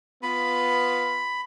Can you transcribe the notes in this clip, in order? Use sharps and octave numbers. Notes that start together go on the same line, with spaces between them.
B3 F4 B5